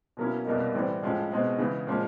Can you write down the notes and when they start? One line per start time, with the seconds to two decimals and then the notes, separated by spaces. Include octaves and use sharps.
0.17 B2 F#3 A#3 C#4 E4
0.45 C2 B2 G3 A#3 D#4
0.74 A2 E3 G3 C4
1.03 A2 F3 G#3 C#4
1.31 B2 G#3 C4 D#4
1.59 C#3 E3 G#3
1.87 A#2 F3 G#3 C#4